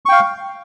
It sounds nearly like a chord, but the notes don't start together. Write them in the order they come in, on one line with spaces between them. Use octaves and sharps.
C#6 G5 F5